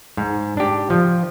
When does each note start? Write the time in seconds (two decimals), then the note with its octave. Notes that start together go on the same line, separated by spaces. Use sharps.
0.17 G#2
0.57 D4 G4
0.90 F3